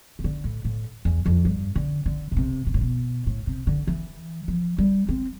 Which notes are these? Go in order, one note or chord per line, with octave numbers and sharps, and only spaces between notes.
C3
D3
A2
A2
E2
F2
G2
D3
D3
B2
C3
B2
A2
B2
A2
C3
D3
E3
F3
G3
C4